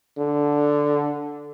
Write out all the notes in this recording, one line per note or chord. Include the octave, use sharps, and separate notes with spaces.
D3